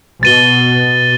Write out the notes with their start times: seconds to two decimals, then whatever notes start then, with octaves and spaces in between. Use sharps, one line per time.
0.23 B2 A6 D#7 G7